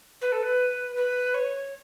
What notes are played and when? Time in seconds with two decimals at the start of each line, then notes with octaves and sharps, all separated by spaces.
0.21 B4
0.32 A4
0.42 B4
0.95 B4
1.34 C#5